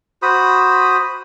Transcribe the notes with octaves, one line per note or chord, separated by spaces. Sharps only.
F#4 C5 B5 D#6